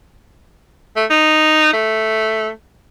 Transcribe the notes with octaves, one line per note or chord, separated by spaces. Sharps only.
A3
D#4
A3